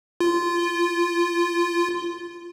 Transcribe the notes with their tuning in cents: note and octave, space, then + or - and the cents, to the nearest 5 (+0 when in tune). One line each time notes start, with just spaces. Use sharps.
F4 -15